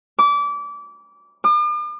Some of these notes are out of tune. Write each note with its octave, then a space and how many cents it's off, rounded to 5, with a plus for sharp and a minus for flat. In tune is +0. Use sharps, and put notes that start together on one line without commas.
D6 -25
D6 +45